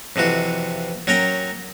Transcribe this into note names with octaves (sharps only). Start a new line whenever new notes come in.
F2 C3 E3 F#4
F#3 C#4 A#4 G5